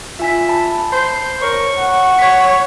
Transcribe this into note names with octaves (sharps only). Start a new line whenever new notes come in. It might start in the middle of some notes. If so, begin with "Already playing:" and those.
F4 E5 G#5 B6
A5 B5
C5
A#4 C#5 C#6
F#5
C#5 B6